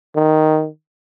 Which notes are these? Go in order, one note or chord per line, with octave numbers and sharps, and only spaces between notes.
D#3